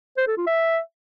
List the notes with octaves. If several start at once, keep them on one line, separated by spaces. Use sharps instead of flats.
C5
A4
F4
E5